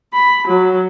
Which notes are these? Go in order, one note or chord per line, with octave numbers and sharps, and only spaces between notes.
B5
F#3